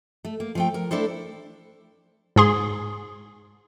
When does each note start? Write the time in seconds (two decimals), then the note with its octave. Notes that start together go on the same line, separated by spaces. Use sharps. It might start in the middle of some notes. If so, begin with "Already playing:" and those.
0.25 A3
0.40 A#3
0.55 F3 A3 G5
0.74 A#4
0.91 A3 D4 E4 A4 C5
2.36 G#2 G#4 C6